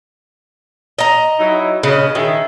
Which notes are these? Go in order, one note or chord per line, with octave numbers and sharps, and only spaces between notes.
D#5 A#5
F#3 D#4 E4
C#3 B4 D#5
D#3 G#4 E5